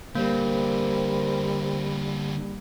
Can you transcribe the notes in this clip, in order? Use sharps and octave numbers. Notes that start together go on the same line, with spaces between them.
D3 G3 A#3 C4 A#4 C5